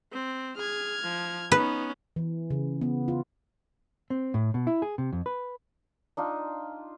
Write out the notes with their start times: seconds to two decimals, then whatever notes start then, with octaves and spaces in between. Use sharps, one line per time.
0.12 C4
0.57 G#4 F6 G#6
1.03 F3
1.52 B3 C#4 D#4 B4
2.16 E3
2.51 C#3
2.81 B3
3.08 F4
4.10 C4
4.34 A2
4.54 B2
4.67 E4
4.82 G#4
4.98 C3
5.13 F2
5.26 B4
6.17 D4 D#4 F4